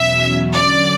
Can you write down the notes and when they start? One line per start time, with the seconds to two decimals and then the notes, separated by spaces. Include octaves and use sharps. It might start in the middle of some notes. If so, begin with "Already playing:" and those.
Already playing: E2 B2 F#3 C#4 E5
0.54 D3 F#3 C#4 D5